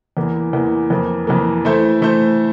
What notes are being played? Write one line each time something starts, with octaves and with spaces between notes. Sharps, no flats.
E2 E3 A#3
E2 E3 A#3
F2 E3 A#3
F2 E3 A#3
E3 A3 E4 A4 C5
E3 A3 E4 A4 C5